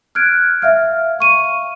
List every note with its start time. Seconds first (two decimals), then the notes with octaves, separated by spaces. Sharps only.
0.15 F6 F#6 G#6 D7
0.62 E5 F5 F6
1.19 F5 C#6 D#7